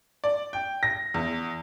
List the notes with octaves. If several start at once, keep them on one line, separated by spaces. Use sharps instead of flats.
D5
G5
A#6
E2